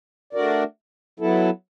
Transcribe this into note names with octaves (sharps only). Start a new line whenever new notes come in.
A3 D4 F#4 A#4 D5
F#3 B3 E4 A4